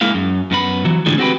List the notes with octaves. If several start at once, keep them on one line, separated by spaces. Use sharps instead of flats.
G#3 A#3 E4 F5
F#2
F#2 B3 B5
E3 F#3
A2 D3 E3 F3 G3 G#3
C4 F#4 G4 B4